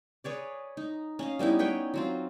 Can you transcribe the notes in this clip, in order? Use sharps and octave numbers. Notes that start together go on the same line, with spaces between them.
G#4 B4 C#5 D5
D#4
C#4 D#5 F5
G3 B3 D#4 E4
B4 C#5 G5 G#5
F#3 C4 F4